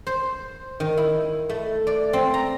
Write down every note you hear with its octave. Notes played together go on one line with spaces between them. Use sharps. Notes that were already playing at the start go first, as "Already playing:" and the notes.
C5
D#3
E4
A3
D5
C4
A#5